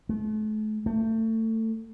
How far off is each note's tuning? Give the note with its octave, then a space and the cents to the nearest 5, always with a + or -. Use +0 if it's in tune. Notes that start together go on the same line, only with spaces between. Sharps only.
A3 -40
A3 +25